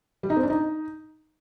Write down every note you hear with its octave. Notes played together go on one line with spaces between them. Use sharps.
G3
D#4
C4
D4
D#4